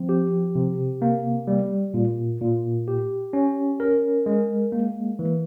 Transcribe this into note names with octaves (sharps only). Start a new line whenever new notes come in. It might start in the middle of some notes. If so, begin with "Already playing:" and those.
Already playing: F3 C4
G4
C3
A#3
G3
A#2
A#2
G4
C#4
A#4
G#3
A#3
E3